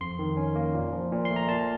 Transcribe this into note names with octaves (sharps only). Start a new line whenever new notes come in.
F2 C6
D#3
C#4
A#3
A#2
F3
A#2
C6
A3
A#5
A#2 A5